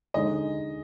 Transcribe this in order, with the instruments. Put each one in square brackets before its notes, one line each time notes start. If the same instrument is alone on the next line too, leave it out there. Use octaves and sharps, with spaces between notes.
[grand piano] D3 G#3 D#4 [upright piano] D#5